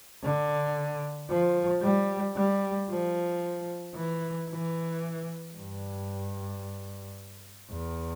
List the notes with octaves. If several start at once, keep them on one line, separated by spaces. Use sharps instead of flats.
D3
F3
G3
G3
F3
E3
E3
G2
E2